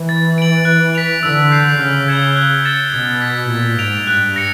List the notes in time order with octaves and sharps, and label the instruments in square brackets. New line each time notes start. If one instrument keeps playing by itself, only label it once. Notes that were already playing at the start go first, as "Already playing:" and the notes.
Already playing: [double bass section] E3
[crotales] A6
D7 F#7
F#6
B6 D7 F7
[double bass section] D3 [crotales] E6
[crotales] G6 C7
[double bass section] C#3 [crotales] F6
[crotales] G#6 C#7 E7 G7
F#6
A6 C#7 E7 G7
[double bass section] B2 [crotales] D#6
[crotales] G#6 B6
[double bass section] A#2 [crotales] A6
[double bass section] G#2 [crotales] D7 F7
[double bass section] G2 [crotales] F#6
[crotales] A#6 C#7